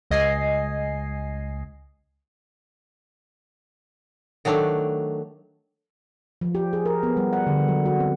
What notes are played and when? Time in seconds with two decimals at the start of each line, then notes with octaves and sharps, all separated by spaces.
0.11 C#2 D#5 G#5 C7
4.45 D#3 F#3 A3 D4
6.41 F3
6.55 G4
6.73 G#4
6.85 A#4
7.03 B3
7.17 G3
7.33 F#5
7.47 D3
7.68 F#3
7.85 F#4
8.00 C4